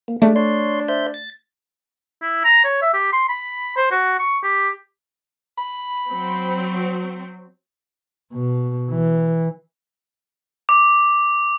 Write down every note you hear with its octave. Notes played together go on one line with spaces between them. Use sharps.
A#3
G#3 A3 D4
D4 C#5 C6
C5 E5 G6
A6
E4
A#5
C#5
E5
G4
C6
B5
C5
F#4
C#6
G4
B5
F#3 C4
B2
E3
D6